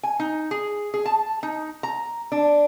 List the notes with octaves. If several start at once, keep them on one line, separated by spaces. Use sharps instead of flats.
G#5
D#4
G#4
G#4
A5
D#4
A#5
D4